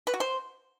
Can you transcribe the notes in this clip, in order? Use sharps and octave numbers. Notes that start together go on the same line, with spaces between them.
B4
F#4
C5